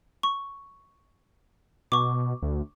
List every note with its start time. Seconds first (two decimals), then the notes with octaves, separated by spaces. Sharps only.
0.23 C#6
1.92 B2 C#6 D6
2.42 D2